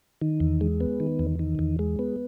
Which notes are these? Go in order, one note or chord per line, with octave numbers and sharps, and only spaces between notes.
D#3
E2
G#3
B3
D#3
E2
D#3
E2
G#3
B3